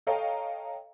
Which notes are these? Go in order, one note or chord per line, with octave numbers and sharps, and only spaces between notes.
A4 C#5 D#5 F5 G5 A#5